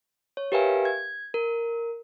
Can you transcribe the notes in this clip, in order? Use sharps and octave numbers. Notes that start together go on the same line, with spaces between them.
C#5
G4 A#4 B4 E5 F5 G#5
G#6
A#4